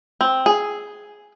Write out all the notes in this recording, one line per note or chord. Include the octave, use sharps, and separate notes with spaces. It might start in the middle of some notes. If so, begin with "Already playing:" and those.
C4
G#4